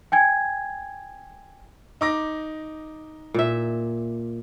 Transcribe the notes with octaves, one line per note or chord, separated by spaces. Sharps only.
G5 G#5 G#6
D#4 D6 A#6
A#2 E5